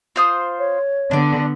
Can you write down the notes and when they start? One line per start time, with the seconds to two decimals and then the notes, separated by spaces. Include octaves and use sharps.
0.16 F4 C5 D#6
0.59 C#5
1.11 D3 B3 D4 D5